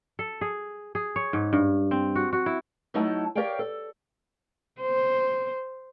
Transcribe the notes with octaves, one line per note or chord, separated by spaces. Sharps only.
A4
G#4
G#4
C#5
G#2
G2
C4
F#4
F#4
E4
F#3 A3 D#4 E4 F#5 A5
G4 A#4 C#5 D5 F5 G5
A4
C5